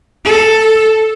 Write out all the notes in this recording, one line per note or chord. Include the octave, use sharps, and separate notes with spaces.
A4